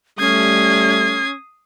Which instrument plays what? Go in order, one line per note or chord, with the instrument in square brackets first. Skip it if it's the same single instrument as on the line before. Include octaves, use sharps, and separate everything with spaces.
[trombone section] G3 A3 [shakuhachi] C#4 [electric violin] D#6 C7 [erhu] G#6